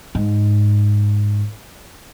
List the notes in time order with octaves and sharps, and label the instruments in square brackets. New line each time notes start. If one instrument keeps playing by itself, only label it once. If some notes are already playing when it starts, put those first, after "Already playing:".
[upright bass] G#2